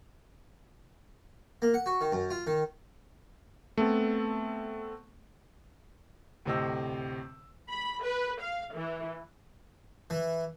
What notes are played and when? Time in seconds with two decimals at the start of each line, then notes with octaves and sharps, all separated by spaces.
1.62 A#3
1.74 F#5
1.86 F#4
2.01 D#3
2.12 F#2
2.30 F4
2.47 D#3
3.78 A3 B3 C4 A4
6.45 D2 A2 C3 C4 D#5 E6
7.69 B5
8.03 B4
8.41 F5
8.73 E3
10.10 E3